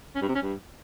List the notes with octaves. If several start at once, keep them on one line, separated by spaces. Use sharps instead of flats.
C#4
G2
C3
C#4
G2